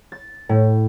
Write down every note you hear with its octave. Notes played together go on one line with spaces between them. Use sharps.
A6
A2